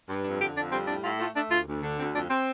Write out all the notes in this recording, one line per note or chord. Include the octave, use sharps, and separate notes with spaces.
G2
F2 D4
D3 G4
F2 D4
G3 C4
A2 D4
A2 F4
A3 F4
A3 D4
D2 F4
D2
D3
D2 C4
F2 D4
C4